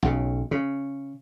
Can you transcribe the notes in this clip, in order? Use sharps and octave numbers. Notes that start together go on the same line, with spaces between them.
B1 C#3
C#3